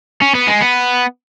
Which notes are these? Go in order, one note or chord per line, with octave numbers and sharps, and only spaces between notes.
C#4
B3
G#3
B3